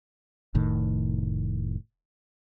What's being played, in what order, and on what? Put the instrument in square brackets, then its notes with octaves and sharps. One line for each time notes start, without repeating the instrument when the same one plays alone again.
[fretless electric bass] F1 A2 D#3